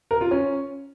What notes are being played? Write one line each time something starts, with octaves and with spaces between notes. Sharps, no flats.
A#4
F4
C#4